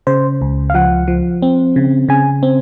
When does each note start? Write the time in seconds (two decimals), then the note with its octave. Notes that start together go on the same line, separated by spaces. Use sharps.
0.07 C#3 C5
0.41 C#2
0.70 F5
0.74 F3 F#5
1.08 F3
1.42 C4
1.76 C#3
2.09 C#3 G#5
2.43 C4